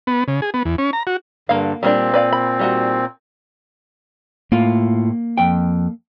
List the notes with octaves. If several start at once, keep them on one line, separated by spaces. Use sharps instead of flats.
B3
C#3
G#4
B3
E2
C#4
A#5
F#4
G2 D3 A#3 F5
A#2 G3 A#3 C4 D4
B4 D5 F5
B5
G3 D#4 F#4
A2 A#3 F4
F2 G5